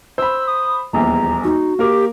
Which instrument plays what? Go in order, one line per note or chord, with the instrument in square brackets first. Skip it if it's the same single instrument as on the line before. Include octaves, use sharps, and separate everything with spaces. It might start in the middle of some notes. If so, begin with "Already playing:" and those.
[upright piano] C5 B5 [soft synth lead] E6
[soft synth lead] D#6
[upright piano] D#1 A#1 E2 [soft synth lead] A#5
[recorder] D#4 [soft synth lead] F#4
[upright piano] A#3 A#4 D6 [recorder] G4